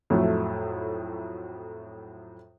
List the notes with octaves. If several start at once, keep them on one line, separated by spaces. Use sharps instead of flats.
F2 A2 F#3 A3